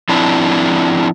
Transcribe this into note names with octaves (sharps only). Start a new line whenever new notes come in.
F3 C4 D4 E4